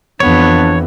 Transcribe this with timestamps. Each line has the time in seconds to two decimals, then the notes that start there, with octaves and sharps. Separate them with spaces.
0.20 F2 E3 B3 D4 C#5